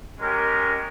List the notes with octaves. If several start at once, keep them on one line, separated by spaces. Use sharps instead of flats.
G#3 C#4 G4 A#4